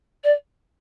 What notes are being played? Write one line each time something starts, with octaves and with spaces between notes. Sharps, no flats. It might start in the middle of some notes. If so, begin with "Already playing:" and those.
D5